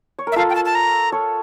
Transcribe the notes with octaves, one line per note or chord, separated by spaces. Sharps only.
C#5
A#4
E5
F4 A4 F5
G5
A5
A5
A#5
A4 C#5